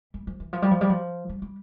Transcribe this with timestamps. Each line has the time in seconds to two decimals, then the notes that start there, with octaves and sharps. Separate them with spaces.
0.14 G3
0.27 F3
0.40 E3
0.53 F3
0.62 G3
0.71 F3
0.81 G3
0.90 F3
1.29 G3
1.42 G3